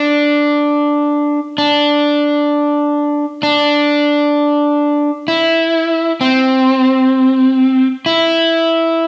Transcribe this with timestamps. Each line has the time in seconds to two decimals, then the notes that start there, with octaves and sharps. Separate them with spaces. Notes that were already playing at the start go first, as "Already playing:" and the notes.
Already playing: D4
1.58 D4
3.43 D4
5.28 E4
6.21 C4
8.06 E4